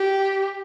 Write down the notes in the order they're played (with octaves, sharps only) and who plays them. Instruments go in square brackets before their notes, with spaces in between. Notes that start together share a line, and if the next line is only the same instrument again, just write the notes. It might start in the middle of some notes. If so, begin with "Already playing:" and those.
Already playing: [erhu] G4